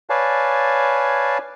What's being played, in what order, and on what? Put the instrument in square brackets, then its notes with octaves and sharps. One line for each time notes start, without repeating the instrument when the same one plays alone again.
[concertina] B4 C#5 D5 F5 G#5 A5